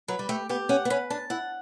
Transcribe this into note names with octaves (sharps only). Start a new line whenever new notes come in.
F#3 B4
G3
A3 G4
B3 G4
C#4 F#5
B3
C#4 B4
D4 A5
E4 F#5